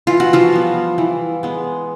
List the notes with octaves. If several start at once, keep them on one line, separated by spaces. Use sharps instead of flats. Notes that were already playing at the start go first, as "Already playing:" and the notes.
E3 F4
F#4
F3 F4
G3 B3
E3
G#3 B3